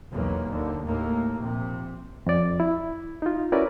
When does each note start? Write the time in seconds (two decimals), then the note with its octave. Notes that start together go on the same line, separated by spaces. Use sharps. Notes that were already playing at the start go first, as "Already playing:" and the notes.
0.12 B1 E2 F#3 A#3
0.49 D#2 D3
0.84 D#2 A2 A#3
1.40 A#1 C3
2.26 F2 D5
2.60 E4
3.22 D#4 F4
3.52 C#4 E4 F#4 A#4 B4 D5